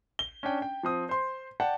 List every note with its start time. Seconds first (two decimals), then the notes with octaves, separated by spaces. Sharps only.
0.19 G7
0.43 C#4 D4 G5
0.62 G5
0.83 F3 C4 D#6
1.09 C5 C6
1.60 D5 F#5 G5 A5